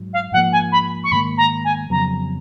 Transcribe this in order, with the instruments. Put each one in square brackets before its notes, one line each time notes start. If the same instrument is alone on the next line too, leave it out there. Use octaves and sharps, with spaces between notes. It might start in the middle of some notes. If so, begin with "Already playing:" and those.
Already playing: [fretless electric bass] G#2 F#3
[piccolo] F5
[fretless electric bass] G#2 F3 A#3 [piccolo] F#5
[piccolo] G#5
B5
C#6
[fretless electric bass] G#2 D#3 A#3 [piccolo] B5
[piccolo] A#5
G#5
[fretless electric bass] F2 C#3 F#3 B3 [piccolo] A#5